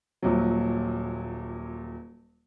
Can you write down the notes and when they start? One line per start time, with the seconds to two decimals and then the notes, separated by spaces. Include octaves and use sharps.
0.23 D#1 A#2 F#3